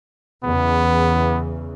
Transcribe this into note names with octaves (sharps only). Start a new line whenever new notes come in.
E2 C#3 E3 B3